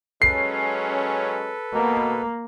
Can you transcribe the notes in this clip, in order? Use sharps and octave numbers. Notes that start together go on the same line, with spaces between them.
F#3 G#3 C#4 A4 B4 C7
B2 A#3